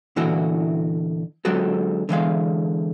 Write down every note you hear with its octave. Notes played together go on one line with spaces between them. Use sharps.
A#2 D3 E3 E4 F#4
D3 F#3 G#3 C4 F#4 A4
D3 E3 G#3 F5